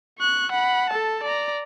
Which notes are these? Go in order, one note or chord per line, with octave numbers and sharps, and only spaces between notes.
C#6 F#6
F#5 B5
A4 A5
D5 A#5